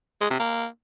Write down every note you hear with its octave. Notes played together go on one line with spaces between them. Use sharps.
G#3
C3
A#3